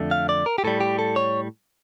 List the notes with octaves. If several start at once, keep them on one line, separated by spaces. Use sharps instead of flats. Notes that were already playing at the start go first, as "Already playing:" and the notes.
Already playing: F2 D3 A3
F5
D5
A#4
G4
A2 G3 A4
G4
A4
C#5